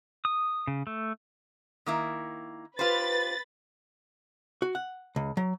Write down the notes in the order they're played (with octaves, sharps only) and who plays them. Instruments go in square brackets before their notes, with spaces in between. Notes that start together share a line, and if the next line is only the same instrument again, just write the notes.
[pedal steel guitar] D#6
C#3
A3
[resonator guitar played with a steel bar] D#3 A#3 E4
[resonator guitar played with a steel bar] F4 G4 C5 [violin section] B4 B5 A6
[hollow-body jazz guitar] F#4
F#5
C#2
F#3